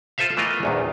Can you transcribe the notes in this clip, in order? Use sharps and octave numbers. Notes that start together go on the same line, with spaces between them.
F4 A4 C5 E5 F5
E3 A3 B3 F4 A#4 D#5
A#1 E2 D#3